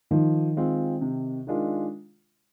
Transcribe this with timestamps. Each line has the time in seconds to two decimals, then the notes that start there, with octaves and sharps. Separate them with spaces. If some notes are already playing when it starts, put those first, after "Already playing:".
0.11 D#3 F3
0.57 G#3 C4 F4
1.01 C3
1.47 D#3 G#3 D4 F4